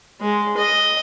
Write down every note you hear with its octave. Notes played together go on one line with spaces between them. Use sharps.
G#3
D#5